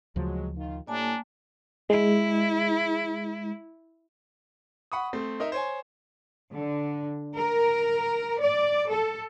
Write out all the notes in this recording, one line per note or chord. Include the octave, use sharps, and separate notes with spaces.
D2 C#3 F3 F#3 G#3
D#3 F4
A2 G3 A#3 D4 G#5 A5
G#3 E4
F#5 B5 C#6 D#6
A3 C4
D#4 A#4 D#5 E5
C5 C#5 G#5
D3
A#4
D5
A4